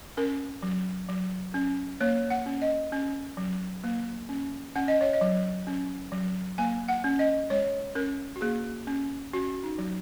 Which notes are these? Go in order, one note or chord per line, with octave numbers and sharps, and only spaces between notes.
C#4 A#4
F#3
F#3
C#4
A#3 C#5
F#5
C#4
D#5
C#4
F#3
A#3
C#4
C#4 F#5
D#5
C#5
D#5
F#3
C#4
F#3
A#3 G#5
F#5
C#4
D#5
G#3 C#5
C#4 A#4
F#4
A#3 G#4
C#4
C#4 F#4
D#4
F#3